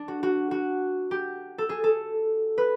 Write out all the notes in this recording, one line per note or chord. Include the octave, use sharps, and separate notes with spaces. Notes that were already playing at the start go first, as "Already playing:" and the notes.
Already playing: D4
F#4
F#4
F#4
G4
A4
G#4
A4
B4